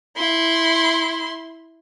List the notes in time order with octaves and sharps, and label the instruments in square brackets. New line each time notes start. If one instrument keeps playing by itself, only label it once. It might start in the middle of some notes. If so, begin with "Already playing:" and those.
[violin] E4 C6